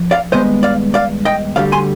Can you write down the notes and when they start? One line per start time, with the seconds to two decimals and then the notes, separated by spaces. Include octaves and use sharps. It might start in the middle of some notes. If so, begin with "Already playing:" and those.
Already playing: F3
0.11 D5 F5
0.32 G2 D#3 G#3 B3 C5 D#5
0.63 D5 F5
0.94 D5 F5
1.25 D#5 G5
1.56 D2 D3 G3 D5 F5
1.72 G#5 C6